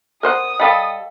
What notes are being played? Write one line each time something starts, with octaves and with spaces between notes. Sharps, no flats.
A#4 C5 F#5 D#6
G3 A4 C#5 D#5 F5 G5